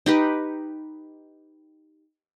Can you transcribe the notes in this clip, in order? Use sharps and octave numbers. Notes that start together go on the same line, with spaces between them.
D#4 G4 B4